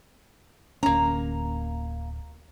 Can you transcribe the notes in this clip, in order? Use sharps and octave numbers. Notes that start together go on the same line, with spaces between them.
D1 A#3 C#4 A#5